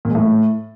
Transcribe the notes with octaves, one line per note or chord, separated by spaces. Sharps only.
A#2
G#3
A2